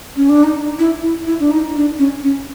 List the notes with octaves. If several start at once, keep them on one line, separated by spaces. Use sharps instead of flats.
C#4
D4
D#4
E4
E4
E4
D4
D#4
D4
C#4
C#4